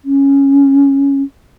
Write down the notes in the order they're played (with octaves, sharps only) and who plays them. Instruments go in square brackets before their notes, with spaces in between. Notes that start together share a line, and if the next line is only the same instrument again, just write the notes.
[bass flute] C#4